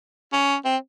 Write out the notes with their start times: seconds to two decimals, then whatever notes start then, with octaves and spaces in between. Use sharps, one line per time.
0.33 C#4
0.65 C4